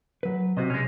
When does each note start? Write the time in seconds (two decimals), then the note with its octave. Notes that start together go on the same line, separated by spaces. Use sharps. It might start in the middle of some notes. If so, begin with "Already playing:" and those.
0.23 F#3 B4
0.57 C3 F#4 C5 D#5
0.70 B1 G#3 C#4